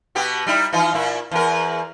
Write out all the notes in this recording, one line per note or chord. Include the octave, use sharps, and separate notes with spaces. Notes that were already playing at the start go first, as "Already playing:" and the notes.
B2 B3 G4
G3 D#4 E4
E3 D#4 F4
A#2 E4
E2 A#4